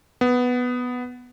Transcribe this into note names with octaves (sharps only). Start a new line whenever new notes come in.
B3